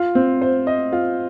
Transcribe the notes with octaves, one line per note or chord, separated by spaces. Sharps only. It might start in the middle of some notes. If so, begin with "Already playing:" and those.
Already playing: F4
C4
C5
D#5
F4